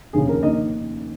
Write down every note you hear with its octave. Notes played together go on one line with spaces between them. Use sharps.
F1 D#2 C#3 G#4
A#4
D#3 A#3 D#5